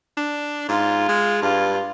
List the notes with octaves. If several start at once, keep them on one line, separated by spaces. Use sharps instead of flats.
D4
G#2 F4
G#3
G2 F4